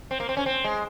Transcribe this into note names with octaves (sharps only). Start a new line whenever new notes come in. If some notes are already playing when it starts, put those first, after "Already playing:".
C4
A#3
C4
C#4
C4
G#3